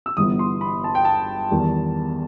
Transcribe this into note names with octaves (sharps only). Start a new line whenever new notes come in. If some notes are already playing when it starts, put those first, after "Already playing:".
E6
G1 G2 E3 G3 B3 D#6
C6
B5
A5
G5
A5
E2 D#3 G3